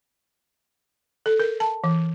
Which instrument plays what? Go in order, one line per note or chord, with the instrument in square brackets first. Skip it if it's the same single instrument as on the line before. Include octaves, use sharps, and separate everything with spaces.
[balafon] A4
A#4
A5
E3